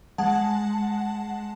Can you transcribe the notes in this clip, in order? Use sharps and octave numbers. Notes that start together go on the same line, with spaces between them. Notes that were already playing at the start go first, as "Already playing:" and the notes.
G#3 F#5 A5